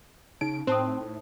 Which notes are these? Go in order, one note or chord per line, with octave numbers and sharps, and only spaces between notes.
C#3 D#4 D7
A2 C4 C5 A5 D#6